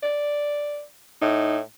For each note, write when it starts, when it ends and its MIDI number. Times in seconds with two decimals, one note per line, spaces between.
0.03 0.83 74
1.22 1.61 45
1.22 1.58 63